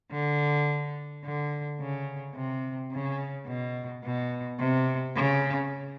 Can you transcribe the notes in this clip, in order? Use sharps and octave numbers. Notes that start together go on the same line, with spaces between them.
D3
D3
C#3
C3
C#3
B2
B2
C3
C#3